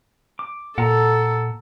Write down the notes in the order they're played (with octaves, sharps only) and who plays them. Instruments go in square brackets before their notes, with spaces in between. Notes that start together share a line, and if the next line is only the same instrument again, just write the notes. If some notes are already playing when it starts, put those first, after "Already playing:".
[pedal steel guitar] D6
[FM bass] A#2 [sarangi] A4 [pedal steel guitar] F#5 A#5